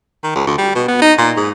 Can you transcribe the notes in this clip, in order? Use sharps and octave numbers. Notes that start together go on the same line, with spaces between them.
D#3
C#2
D2
G3
B2
B3
D#4
A#2
G#2